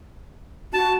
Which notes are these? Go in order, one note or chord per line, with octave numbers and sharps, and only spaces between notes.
F#4 A5